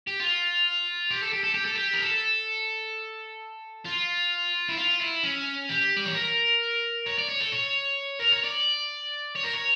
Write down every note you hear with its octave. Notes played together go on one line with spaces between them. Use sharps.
G4
F4
G4
A4
G4
A4
G4
A4
G4
A#4
A4
F4
E4
F4
E4
C#4
G4
D5
C#5
A#4
C#5
D5
C#5
A4
C#5
A#4
C#5
D5
C#5
A#4
C#5